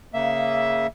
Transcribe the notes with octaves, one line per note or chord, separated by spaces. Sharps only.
C#3 A#3 E5